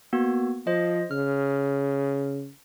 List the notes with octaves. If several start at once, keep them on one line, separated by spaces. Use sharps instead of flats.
A#3 B3 F#4
F3 C5 D#5
C#3 F6